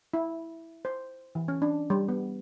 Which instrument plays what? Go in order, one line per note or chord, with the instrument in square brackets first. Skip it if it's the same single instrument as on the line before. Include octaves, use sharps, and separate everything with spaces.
[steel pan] E4
C5
E3
C#4
D4
G3
B3